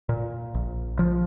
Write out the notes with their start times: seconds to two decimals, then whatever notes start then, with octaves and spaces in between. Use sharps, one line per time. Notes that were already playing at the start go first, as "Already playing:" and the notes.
0.09 A#2
0.54 A#1
0.99 F3